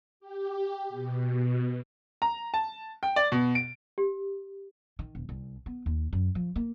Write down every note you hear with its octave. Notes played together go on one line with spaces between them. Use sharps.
G4
B2
A#5
A5
G5
D5
B2
D7
G4
D#3
E1
C2
B3
D#2
F#2
F3
A#3